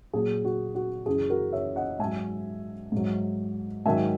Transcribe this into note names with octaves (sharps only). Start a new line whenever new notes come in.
A#2 F#3 G#4
F#4
F#4
F#2 C#3 E3 G#4
F#4 A#4
C#5 E5
D#5 F#5
G#2 F#3 E5 G#5
G#2 F#3
G#2 D#3 F#3 E5 G#5